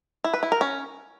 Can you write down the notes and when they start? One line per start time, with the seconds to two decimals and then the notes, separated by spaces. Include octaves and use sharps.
0.24 E4
0.34 B4
0.43 E4
0.52 A#4
0.61 C#4